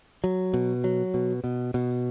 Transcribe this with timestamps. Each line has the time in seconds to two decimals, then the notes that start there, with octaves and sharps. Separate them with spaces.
0.24 F#3
0.54 B2
0.84 F#3
1.14 B2
1.44 B2
1.74 B2